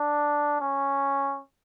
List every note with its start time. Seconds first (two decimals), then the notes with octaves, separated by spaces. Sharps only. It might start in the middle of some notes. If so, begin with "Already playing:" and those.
Already playing: D4
0.60 C#4